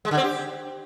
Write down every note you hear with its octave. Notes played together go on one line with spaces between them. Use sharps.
G#3
D3
C4
G4